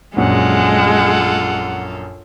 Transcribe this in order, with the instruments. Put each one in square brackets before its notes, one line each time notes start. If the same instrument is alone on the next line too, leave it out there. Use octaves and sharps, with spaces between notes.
[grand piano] A#1 F#2 [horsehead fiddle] G#3 [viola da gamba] F4 A4 [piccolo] F#5